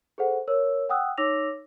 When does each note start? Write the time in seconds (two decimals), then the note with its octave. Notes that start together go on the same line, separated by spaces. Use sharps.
0.18 G#4 A4 C5 F#5
0.48 A#4 C#5 E6
0.89 F#5 G5 D#6 E6 F#6
1.18 D#4 C#5 D6 E6 A#6 F7